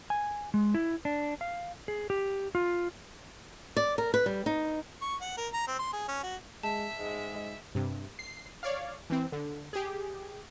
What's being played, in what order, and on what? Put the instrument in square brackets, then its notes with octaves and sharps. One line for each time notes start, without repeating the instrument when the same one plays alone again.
[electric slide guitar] G#5
G#3
E4
D4
F5
G#4
G4
F4
[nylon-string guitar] D5
A#4
B4
G3
D#4
[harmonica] C#6
F#5
A#4
A#5
C4
C6
G#4
C#4
F#4
[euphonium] G#3 [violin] E5 [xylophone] A5
[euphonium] G#2 [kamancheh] G#3
[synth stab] G2 C3
C7
C#5 D5 F5
E3 C4
D3
G4 G#4